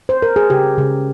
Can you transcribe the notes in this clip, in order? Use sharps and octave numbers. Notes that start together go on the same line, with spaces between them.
C5
A#4
G#4
C#3 G4
C#3